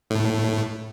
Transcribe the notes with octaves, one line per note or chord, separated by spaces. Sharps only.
A2